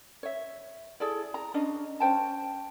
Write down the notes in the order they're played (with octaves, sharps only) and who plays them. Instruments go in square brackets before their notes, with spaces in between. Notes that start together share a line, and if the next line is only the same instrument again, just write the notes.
[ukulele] C#5 E5
E4 G#4 A4 D5
A#5
C#4 D4 D#5
C#4 C5 G5 A5